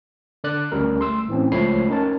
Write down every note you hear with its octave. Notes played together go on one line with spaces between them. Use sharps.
D3 D5 F#6
D2 G3 C#4 A#4
G1 A3 C6 E6
A2 E3 C4 C#4
C#2 F3 A3 C#5 B5 C7
C#4 D#4 A#4 C#5 A5